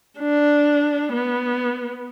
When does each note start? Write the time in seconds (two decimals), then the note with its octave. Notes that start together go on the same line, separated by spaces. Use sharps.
0.19 D4
1.12 B3